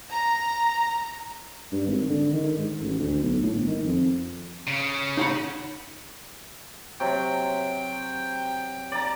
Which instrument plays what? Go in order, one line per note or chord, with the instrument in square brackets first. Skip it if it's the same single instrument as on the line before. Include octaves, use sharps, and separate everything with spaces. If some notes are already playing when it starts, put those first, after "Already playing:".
[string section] A#5
[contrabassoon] G2
G#1
D3
D#3
G#2
A1
D2
B1
A2
G1
D#3
F2
[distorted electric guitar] C#3
[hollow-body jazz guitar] D#4 F#5 B5
[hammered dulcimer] C3 F#3 [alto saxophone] G5
[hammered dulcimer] D5 A5 A#5